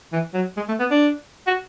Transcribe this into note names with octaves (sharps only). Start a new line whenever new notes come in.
E3
F#3
G#3
A3
B3
D4
F#4